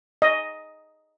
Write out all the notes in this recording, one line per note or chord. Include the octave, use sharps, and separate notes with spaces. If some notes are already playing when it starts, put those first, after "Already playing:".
D#5